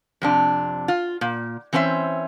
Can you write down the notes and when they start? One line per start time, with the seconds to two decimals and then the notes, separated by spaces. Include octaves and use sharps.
0.22 F2 C3 D4
0.88 F4
1.21 A#2
1.73 E3 C4 C#4 C5 E5